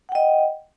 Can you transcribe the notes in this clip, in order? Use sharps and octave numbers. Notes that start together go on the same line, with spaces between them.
D#5 F#5 G5